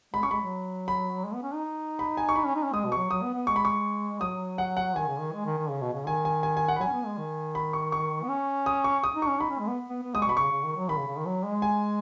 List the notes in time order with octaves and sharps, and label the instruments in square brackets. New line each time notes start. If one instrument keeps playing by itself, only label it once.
[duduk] G#3 [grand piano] B5
[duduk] C#4 [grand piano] C#6
[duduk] G#3 [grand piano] B5
[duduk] F#3
[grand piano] B5
[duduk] G#3
B3
C#4
D#4
[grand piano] B5
G#5
C#6
[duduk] D#4 [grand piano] B5
[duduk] C#4
D#4
C#4
[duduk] G#3 [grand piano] D#6
[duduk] B2
[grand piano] C#6
[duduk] F#3
[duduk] F#3 [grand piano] D#6
[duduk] B3
B3
[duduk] G#3 [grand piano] C#6
[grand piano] B5
C#6
[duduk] F#3 [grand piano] D#6
[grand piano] F#5
F#5
[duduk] D#3 [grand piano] G#5
[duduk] C#3
D#3
G#3
D#3
D#3
C#3
B2
C#3
[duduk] D#3 [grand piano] G#5
[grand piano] G#5
G#5
G#5
F#5
B5
[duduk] F#3 [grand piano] G#5
[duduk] C#4
B3
G#3
D#3
[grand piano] B5
C#6
C#6
[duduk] B3
C#4
[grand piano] D#6
C#6
D#6
[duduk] D#4
[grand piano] C#6
[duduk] C#4
[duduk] D#4 [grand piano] B5
[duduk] C#4
G#3
B3
B3
B3
[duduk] G#3 [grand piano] D#6
[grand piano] C#6
[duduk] B2 [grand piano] B5
[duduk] C#3 [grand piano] C#6
[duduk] C#3
D#3
F#3
[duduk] D#3 [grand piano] B5
[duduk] C#3
C#3
D#3
F#3
G#3
[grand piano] G#5